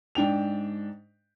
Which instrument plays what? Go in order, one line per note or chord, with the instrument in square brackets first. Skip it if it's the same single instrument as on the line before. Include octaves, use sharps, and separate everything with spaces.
[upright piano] G#2 D4 G5 F7